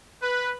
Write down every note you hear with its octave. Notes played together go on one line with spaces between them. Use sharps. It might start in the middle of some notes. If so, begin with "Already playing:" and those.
B4